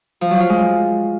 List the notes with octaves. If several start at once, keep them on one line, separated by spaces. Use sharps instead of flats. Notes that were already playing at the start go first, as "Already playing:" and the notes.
F3
F#3
F4
G#3